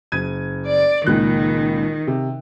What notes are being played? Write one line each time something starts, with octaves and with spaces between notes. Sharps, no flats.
F#1 G#6 D#7
D5
C#2 A#2 D#3 F#6
C3